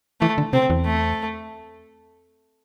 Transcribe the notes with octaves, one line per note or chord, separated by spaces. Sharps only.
E3 A3
D3
C3 C4
E2
A3